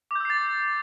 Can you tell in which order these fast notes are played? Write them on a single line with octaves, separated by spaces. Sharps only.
D6 G6 E6 C7 A6